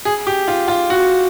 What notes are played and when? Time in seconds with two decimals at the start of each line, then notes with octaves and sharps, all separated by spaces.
0.05 G#4
0.27 G4
0.48 F4
0.68 F4
0.90 F#4